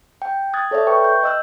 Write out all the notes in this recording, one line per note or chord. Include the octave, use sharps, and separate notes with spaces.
G5
D#6 F#6 G#6 A6
A4 C#5 D5 E5
B4 G5 C#6
G6
D#5 E6 F#6